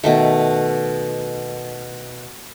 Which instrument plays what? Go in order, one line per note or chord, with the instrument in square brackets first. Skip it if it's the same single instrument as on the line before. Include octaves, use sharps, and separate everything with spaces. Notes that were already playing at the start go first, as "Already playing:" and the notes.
[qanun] B2 D#3 A3